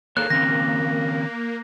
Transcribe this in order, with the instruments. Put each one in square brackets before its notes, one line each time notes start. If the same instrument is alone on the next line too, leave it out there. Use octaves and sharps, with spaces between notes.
[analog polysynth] A#3 [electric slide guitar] G#4 A4 C#5 [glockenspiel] F#6
[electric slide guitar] D#3 C4 C#4 [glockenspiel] A#6